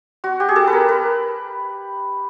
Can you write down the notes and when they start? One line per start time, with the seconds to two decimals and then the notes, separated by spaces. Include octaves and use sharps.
0.24 F#4
0.40 G4
0.49 G#4
0.56 A4
0.67 B4
0.72 A#4
0.89 B4